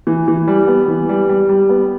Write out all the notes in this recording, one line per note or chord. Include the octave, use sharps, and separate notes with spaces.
E3
E3
G3
B3
E3
G3
G3
G3
B3